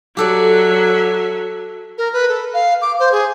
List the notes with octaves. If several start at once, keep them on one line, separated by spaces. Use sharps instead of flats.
F#3 G4 A4 D5 E5
A#4
B4
A4
F5
D6
C5
G#4